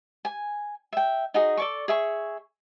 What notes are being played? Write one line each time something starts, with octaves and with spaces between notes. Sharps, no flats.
G#5
E5 G5
D#4 F#4 G#4
A4 D5 C#6
G#4 E5 C#6